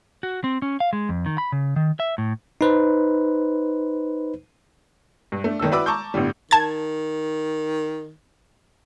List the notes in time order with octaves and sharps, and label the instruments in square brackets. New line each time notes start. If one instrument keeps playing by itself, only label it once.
[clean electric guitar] F#4
C4
C#4
F5
G#3
F2
D#3
B5
C#3
D#3
E5
A2
[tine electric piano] D#4 B4 C5
[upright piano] G2
A3 D4
F#1 D#3 A4 E6
E4 F#4 B4 D5 D6 E6
A5 A#5 C#6 D6 E6 G6
G1 A2 D3 G3
[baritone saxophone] D#3 [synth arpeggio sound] A5 G#6